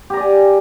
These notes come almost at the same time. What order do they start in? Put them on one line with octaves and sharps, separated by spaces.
G4 A#5 D5 G#5